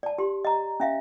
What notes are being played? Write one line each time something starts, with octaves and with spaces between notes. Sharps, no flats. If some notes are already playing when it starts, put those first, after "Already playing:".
D5 A5
G4 C6
D#5 A#5
C#4 E5 F5